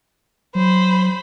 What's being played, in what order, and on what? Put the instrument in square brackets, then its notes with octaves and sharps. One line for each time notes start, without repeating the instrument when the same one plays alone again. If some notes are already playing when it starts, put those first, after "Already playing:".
[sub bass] F#3 [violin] C5 B5